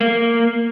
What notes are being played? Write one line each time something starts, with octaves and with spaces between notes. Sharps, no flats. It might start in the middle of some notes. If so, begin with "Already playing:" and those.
A#3